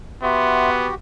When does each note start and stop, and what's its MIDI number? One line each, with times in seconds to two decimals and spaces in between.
0.23 0.89 59
0.23 0.95 66
0.23 0.95 67
0.23 0.70 76
0.23 0.70 84